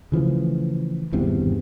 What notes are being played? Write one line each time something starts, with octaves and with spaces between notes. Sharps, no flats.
C#3 E3 F3 A3
G#1 E2 G2 C3